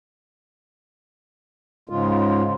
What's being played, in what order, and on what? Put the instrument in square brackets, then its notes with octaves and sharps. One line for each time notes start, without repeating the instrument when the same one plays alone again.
[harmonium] G#2 C#3 G#3 F4